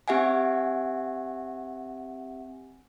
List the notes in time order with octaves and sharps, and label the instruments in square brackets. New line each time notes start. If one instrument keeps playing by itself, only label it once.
[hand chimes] C4 G4 E5 F#5 G#5